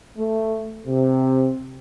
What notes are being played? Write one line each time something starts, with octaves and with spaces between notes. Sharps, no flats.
A3
C3